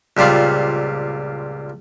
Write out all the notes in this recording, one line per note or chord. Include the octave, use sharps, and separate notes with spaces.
C#2 A#2 G3 C4 F4